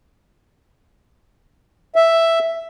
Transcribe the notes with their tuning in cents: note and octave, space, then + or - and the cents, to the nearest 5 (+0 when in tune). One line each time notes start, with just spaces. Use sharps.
E5 +5